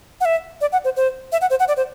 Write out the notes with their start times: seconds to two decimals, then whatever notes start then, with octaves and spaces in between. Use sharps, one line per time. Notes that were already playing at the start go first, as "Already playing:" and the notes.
0.20 F#5
0.25 E5
0.61 D5
0.72 F#5
0.84 C5
0.96 C5
1.32 E5
1.41 F#5
1.50 C5
1.59 F#5
1.68 D5
1.77 C5